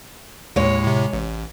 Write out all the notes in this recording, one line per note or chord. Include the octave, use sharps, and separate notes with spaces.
D#2 A2 G#3 C#5
A2 C3
A1